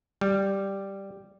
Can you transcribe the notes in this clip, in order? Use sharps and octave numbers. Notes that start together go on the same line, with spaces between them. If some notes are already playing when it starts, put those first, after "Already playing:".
G3